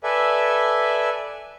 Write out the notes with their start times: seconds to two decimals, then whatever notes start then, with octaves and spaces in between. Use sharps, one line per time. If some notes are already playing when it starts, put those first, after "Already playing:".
0.03 A4 B4 D5 E5 G#5